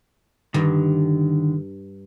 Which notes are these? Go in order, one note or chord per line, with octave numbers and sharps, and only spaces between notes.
G2 D3 D#3